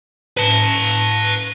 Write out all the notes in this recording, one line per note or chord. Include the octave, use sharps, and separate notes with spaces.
B4 A5